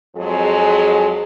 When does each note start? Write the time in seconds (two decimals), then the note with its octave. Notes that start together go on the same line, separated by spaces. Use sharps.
0.16 F2 F#3 G#3 G#4